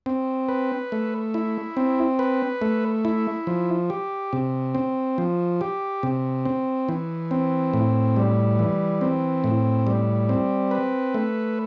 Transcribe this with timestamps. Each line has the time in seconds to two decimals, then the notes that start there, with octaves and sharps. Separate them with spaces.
0.06 C4
0.49 B4
0.92 A3
1.34 E4
1.77 C4
2.19 B4
2.62 A3
3.05 E4
3.47 F3
3.90 G4
4.33 C3
4.75 C4
5.18 F3
5.61 G4
6.03 C3
6.45 C4
6.89 E3
7.31 C4
7.73 A2
8.16 G3
8.59 E3
9.01 C4
9.44 A2
9.87 G3
10.29 C4
10.71 B4
11.14 A3